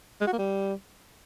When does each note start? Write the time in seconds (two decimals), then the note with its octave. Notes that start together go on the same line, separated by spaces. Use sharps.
0.21 G#3
0.27 F#4
0.33 A#3
0.38 G3